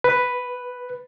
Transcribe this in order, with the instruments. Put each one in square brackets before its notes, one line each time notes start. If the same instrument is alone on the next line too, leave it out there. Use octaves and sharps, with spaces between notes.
[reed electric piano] B4